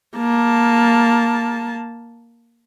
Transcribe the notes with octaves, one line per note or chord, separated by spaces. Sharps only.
A#3 A5